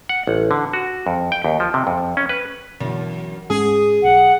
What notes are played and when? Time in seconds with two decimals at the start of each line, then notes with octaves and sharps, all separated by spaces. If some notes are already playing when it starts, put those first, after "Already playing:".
0.09 F#5
0.27 A1
0.51 D3
0.73 F#4
1.07 F2
1.32 G5
1.44 D#2
1.60 F3
1.74 C3
1.87 F2
2.17 C#4
2.29 B4
2.80 F#2 B2 D3 E3
3.50 G#2 G#3 C#4 G#4
4.03 B1 F#5